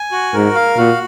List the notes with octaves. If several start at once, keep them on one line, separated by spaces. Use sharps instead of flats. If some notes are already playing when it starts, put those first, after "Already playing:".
Already playing: G#5
F#4
G#2 A#4
F5
A#2 F#4